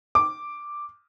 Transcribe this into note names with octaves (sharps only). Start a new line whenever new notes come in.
D6